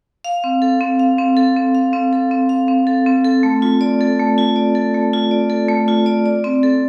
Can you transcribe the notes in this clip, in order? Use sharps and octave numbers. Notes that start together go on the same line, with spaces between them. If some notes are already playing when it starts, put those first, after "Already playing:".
F5
C4
A4
C4
F5
C4
A4
C4
F5
C4
A4
C4
F5
C4
A4
C4
A4
A3
F4
D5
A4
A3
F4
D5
A4
A3
F4
D5
A4
A3
F4
D5
D5
C4
A4